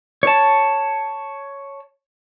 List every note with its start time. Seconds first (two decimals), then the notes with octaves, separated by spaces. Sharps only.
0.23 C#5 A5